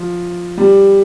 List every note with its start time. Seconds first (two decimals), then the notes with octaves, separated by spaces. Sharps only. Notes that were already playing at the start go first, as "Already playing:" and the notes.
Already playing: F3
0.58 G3